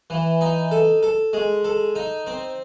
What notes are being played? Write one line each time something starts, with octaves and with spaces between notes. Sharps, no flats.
E3
D#4
A4
A4
G#3
A4
D#4
C4